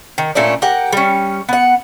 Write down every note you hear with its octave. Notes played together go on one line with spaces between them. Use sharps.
D#3
A#2 A3 C#4 D4
G4 A#4 F#5
G3 C#4
B3 F#5